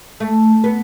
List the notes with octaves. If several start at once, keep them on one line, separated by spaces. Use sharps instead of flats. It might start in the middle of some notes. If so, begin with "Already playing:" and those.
A3
B3